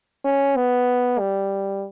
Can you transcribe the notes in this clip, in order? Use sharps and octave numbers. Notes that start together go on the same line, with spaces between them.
C#4
B3
G3